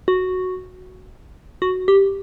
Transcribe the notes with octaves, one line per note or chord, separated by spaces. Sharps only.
F#4
F#4
G4